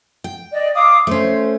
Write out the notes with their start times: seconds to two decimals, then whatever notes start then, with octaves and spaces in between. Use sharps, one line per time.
0.24 G5
0.52 D5 D#5
0.75 F5 D6 D#6
1.07 A3 C#4 C5